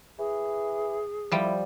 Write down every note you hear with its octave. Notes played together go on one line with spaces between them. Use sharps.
E3 G#4
F3 G3 E4 G5